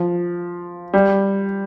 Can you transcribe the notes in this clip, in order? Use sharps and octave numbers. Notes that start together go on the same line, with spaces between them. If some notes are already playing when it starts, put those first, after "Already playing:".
Already playing: F3
G3